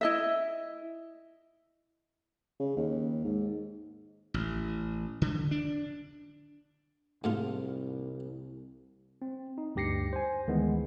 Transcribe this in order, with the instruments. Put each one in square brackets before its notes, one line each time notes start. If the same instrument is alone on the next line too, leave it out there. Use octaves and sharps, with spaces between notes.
[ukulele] E4 D#5 E5
[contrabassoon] C#3
D#2
G#2
[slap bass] A1
D3
D4
[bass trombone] C2 [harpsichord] G#2 A3 F4
[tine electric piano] C4
D#4
D2 G2 G4 A#6 C7 C#7
C5 G#5
D2 D#3 E3 G#3 B3